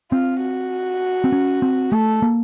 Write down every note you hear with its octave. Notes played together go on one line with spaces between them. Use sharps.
C4 F4
F#4
C4
C#4
C4
A3 A4
A#3